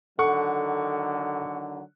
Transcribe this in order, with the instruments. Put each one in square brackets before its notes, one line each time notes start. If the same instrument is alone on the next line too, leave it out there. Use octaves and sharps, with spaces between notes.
[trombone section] D3 D#3 F#3 [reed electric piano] A4 [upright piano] F#5 C#6